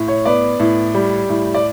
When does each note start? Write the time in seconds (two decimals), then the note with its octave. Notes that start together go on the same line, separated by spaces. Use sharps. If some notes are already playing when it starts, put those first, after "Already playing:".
Already playing: A2
0.08 C#5
0.26 B3 D5
0.60 A2
0.95 G3
1.29 A2
1.55 D5